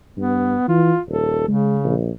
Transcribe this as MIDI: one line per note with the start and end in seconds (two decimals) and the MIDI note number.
0.17 0.55 43
0.17 0.66 59
0.68 0.94 52
0.68 1.00 65
1.08 1.45 27
1.08 1.46 69
1.48 1.95 49
1.48 1.78 56
1.84 2.10 34